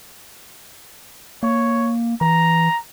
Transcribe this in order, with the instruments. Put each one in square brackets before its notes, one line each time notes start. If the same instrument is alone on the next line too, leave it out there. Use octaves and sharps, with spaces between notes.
[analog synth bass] A#3 [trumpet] C#5
[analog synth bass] E3 [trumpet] A#5